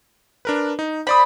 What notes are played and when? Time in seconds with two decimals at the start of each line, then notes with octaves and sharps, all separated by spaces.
0.45 D4 A#4 B4
0.79 D#4
1.07 C5 D5 B5 D#6